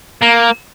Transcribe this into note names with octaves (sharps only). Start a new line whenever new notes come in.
A#3